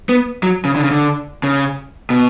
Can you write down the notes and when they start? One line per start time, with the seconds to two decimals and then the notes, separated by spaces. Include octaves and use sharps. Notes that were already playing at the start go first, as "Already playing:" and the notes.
0.09 B3
0.43 F#3
0.65 C#3
0.76 D3
0.83 C#3
0.91 D3
1.43 C#3
2.10 B2